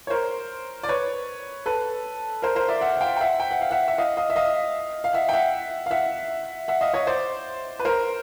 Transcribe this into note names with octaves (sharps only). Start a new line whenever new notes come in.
C#5
A#4 C5
D5
B4 C#5
A4 B4
A#4 C5
A#4 C5
D5 E5
E5 F#5
F#5
F5 G5
G5
E5 F#5
G5
F#5
F5
E5 F#5
E5
D#5 F5
D#5 F5
E5
D#5 F5
F5
E5 F#5
G5
E5 F#5
F5
E5 F#5
E5 F#5
D#5 F5
C#5 D#5
C5 D5
B4
A#4 C5